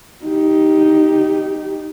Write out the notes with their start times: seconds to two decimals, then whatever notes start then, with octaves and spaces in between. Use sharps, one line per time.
0.25 D#4 G4